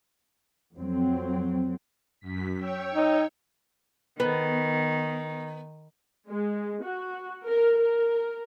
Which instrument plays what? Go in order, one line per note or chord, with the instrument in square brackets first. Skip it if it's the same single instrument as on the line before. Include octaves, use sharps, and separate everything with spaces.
[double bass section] F2 F#3 C4
[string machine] F#2 B6
C#5 G5 E6
[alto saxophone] D#4
[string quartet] D#3 [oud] B3
[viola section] G#3
F#4
A#4
A#4